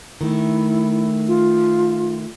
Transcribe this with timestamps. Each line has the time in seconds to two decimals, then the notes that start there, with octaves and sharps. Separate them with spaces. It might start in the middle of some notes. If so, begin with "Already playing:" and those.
0.21 D#3 A3 E4
1.28 F4